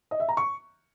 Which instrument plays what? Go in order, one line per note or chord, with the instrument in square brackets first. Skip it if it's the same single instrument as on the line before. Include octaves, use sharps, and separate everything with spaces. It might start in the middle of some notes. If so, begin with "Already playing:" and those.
[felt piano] D#5
E5
A#5
C#6